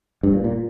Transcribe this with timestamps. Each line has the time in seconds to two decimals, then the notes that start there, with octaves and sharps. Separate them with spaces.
0.23 G2
0.33 A#2
0.44 A#2